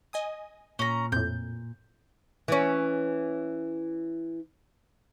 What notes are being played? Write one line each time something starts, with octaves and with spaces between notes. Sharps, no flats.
D#5 G#5 D#6
A#2 C#4 A#5
F2 A2 G6
E3 C#4